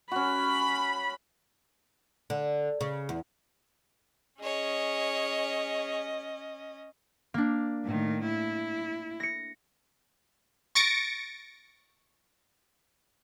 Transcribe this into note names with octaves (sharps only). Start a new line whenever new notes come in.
C#4 F#4 B5
D3
C#3
E2
C#4 G#4 C#5 D#5
A#3 D4
A2 D#3
E4
A#6 C#7
C#6 A6 A#6 C#7 D7